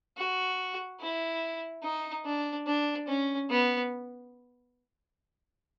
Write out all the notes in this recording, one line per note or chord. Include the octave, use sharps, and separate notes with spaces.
F#4
E4
D#4
D4
D4
C#4
B3